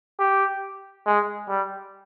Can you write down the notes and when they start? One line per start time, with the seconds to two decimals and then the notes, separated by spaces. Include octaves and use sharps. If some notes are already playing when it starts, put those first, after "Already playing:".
0.19 G4
1.06 G#3
1.48 G3